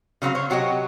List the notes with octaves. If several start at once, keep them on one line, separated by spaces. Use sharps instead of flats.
C#3 F#3 C4 C5 F5
C5 C#5
C3 F#3 F#4 G4 D#5